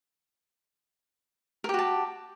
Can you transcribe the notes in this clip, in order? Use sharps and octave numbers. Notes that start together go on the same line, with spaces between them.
F#4 G4 A#4 A5